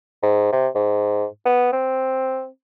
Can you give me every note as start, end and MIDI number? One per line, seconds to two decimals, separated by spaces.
0.23 0.49 44
0.53 0.68 48
0.75 1.25 44
1.46 1.70 59
1.73 2.47 60